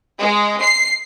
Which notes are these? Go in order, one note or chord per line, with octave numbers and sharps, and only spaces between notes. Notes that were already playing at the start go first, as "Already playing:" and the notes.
G#3
C7